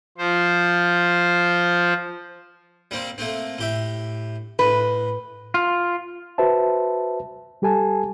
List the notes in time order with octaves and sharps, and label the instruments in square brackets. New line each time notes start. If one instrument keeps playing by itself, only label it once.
[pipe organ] F3 C5
[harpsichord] G3 A#3 C4
A3 A#3 C4
A2 G4 E5
[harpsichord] A2 [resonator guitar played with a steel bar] B4
[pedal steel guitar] F4
[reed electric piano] F#4 B4 C5 E5 A5
G3 G4 A4 G#5 A5